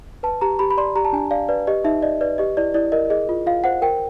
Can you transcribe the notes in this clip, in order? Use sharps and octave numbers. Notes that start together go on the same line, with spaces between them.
B4 A5
G4 A#5
G4 B5
B5
D5 C6
G4 A#5
A5
D4 G#5
D5 F5
B4 D5
G4 D#5
D#4 E5
D5 D#5
B4 D5
G4 D#5
E4 D5
E4 D5
A#4 D#5
G#4 D#5
F4
F4 F5
C5 F#5
A#4 G5